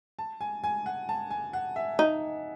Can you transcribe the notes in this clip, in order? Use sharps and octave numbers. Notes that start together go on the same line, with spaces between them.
A5
G#5
G#5
F#5
A5
G#5
F#5
E5
D#4